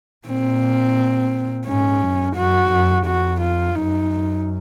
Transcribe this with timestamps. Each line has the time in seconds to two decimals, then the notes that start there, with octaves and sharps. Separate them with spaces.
0.27 A#2 C4
1.66 G#2 C#4
2.01 F#2
2.36 F#2 F#4
2.71 F#2
3.06 F2 F#4
3.41 F4
3.75 F#2 D#4